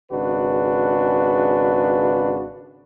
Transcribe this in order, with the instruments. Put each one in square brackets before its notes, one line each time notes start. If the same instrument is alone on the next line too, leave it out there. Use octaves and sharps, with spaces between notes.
[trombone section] G#1 C#3 D4 F#4 B4